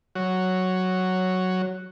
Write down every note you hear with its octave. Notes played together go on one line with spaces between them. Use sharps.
F#3 F#4 C#5